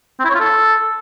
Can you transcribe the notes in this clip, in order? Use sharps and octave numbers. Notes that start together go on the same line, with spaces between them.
C4
E4
C#5
F4
A4